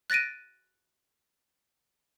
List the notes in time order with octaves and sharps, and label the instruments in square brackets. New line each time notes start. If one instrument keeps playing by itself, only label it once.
[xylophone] F#6 A6 A#6 D7 D#7